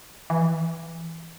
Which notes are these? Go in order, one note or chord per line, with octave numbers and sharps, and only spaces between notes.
E3